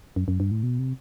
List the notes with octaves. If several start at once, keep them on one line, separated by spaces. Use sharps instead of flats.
F#2
F#2
G2
A2
B2
C3